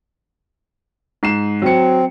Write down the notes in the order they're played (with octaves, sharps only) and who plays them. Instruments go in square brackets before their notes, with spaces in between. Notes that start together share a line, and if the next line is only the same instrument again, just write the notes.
[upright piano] G#2 C7 E7
[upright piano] F#3 C#7 [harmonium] C4